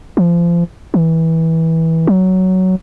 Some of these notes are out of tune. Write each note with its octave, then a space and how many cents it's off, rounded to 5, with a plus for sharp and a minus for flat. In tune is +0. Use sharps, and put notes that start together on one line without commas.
F3 -30
E3 -20
F#3 +10